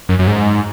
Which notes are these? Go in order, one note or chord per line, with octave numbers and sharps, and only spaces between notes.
F#2
F#2
G#2